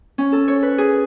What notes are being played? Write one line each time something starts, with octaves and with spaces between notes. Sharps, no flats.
C#4
A4
C#5
B4
G#4